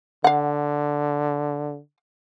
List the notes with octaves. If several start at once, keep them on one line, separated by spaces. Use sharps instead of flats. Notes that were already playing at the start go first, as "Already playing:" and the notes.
D3 F5 F#5